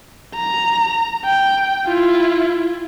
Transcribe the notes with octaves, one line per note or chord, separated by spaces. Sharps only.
A#5
G5
E4 F4